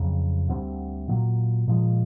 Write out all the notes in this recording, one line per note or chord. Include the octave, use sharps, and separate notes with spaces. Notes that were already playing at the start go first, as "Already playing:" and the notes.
Already playing: F2 C#3 F#3
D2 D3 G3 C4
A#2 F#3 A#3
A#2 F3 G#3